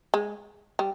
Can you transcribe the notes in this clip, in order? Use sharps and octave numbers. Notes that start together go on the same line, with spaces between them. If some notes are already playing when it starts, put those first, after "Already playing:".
G#3
G3